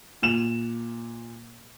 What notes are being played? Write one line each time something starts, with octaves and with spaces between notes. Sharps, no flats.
A#2 E7 F7